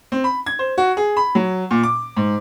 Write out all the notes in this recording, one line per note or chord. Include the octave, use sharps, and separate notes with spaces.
C4
B5
G#6
C5
F#4
G#4
B5
F#3
A#2
D6
G#2